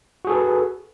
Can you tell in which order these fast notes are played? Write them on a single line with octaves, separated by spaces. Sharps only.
F#4 G#4 A4 B4